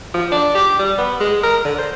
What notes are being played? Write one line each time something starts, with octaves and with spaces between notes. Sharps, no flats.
F3
D4
G4
G3
B3
G#3
A#4
D3
C5